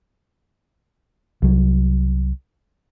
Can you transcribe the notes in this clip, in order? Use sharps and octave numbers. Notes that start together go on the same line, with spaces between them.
C2 F#3